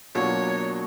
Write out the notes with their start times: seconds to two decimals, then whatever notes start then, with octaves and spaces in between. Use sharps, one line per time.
0.15 B2 F#3 A#3 D4 F4 C#5